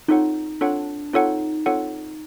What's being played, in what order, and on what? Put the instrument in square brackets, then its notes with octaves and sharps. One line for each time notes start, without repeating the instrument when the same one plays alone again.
[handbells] C4 F4 A4 C#5 F#5 [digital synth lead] D#4
[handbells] C4 F4 A4 C#5 F#5 [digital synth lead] D4
[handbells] C4 F4 A4 C#5 F#5 [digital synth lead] D#4
[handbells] C4 F4 A4 C#5 F#5